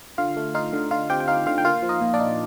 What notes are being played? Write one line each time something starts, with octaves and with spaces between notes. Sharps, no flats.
D3 F4 F5
A3
D#4 F4 F5
D3
D3 F4 F5
C4 G4 G5
G5
D#4 F4 F5
D3 F4 F5
G5
A#3 F4 F5
F3
D#4 D#5
A#2
D4 D5
D#4